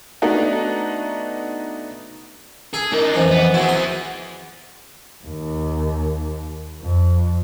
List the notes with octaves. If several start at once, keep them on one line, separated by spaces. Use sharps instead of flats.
A3 B3 D4 D#4 F#4
G#4 A4
D4 D#4 A#4
F2 E3 C5
B3
C4 E4 F#4 G#4
C6
D#2
F2